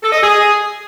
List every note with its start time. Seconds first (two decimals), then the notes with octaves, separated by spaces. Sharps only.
0.03 A4
0.12 D#5
0.22 G#4